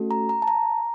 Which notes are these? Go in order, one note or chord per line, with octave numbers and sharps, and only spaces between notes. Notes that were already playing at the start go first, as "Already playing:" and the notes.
Already playing: A3 C#4 F#4 A4
A#5
A#5
A5
A#5